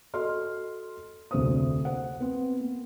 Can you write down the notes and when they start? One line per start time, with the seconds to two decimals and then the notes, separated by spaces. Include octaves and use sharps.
0.14 F#4 A4 D#5 C6 F6
1.31 F1 D2 C5 D#6
1.85 C5 F#5
2.20 B3 C4
2.60 A#3